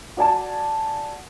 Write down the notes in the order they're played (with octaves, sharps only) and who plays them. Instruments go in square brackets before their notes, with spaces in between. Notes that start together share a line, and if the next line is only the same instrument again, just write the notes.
[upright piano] F#4 D5 G#5 A5